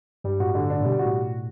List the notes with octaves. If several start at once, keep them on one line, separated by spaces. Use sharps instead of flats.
G2 G3
A2 F#4
D3
D4
A2
B2 G3
F#4
A2